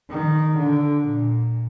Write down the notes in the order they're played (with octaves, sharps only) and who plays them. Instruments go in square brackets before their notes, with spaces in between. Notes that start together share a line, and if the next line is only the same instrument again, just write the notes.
[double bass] D#3
D3
A#2